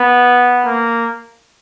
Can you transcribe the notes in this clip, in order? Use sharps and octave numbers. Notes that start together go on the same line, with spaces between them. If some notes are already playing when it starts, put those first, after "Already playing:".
Already playing: B3
A#3